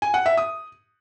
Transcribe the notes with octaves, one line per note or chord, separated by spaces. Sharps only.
G#5
F#5
E5
D#6